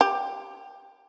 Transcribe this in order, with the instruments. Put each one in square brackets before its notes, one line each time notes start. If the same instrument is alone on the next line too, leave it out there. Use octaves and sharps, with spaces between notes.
[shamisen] G4